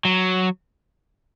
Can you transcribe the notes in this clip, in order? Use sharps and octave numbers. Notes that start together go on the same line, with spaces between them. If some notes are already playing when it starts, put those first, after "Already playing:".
F#3